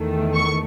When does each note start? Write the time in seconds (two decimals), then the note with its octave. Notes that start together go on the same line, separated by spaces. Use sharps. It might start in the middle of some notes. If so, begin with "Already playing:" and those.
Already playing: E2 D#3 A3
0.34 C#6